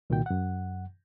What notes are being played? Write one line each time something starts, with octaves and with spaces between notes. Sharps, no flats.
C2 A#2 D#3 F#4 G5
F#2 F#5